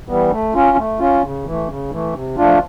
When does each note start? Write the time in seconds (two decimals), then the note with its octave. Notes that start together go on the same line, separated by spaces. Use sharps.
0.09 E3 G3 B3
0.31 A3
0.55 C#4 F4
0.77 A3
1.00 C#4 F4
1.23 C#3
1.45 E3 A3
1.68 C#3
1.91 E3 A3
2.13 C3
2.37 F3 A3 D4 F4